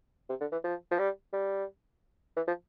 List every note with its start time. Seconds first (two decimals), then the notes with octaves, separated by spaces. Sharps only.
0.29 C3
0.41 D3
0.52 E3
0.64 F3
0.91 F3
0.99 G3
1.33 G3
2.36 E3
2.47 F3